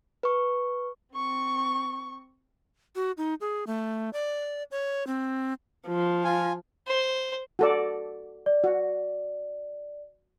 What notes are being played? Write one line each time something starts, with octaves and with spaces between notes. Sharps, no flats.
B4 C#6
C4 C#6
F#4
D#4
G#4
A3
D5
C#5
C4
F3
F4 G#5
C5
F#4 A4 D5
D5
F#4